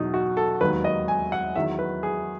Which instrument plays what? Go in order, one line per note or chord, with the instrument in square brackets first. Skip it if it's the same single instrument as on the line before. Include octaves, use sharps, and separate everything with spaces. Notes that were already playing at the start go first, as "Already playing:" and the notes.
Already playing: [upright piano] E2 B2 F#3 D#4
F#4
A4
E1 D#2 D#3 F#3 B4
D#5
G#5
F#5
E2 D#3 F#3 E5
B4
G#4